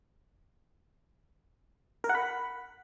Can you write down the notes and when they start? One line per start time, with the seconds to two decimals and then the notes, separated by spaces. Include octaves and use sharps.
2.04 A#4
2.09 F#5
2.15 B5